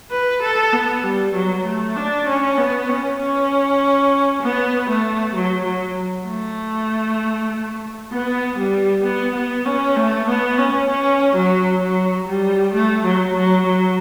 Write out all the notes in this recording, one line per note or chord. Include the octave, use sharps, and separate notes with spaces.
B4
A4
B3
G3
F#3
A3
D4
C#4
B3
C#4
C#4
B3
A3
F#3
F#3
A3
B3
G3
B3
B3
C#4
A3
B3
C#4
C#4
F#3
F#3
G3
A3
F#3
F#3
F#3